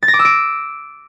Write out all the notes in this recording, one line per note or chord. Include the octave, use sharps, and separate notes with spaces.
A6
A#6
D6
E6
D7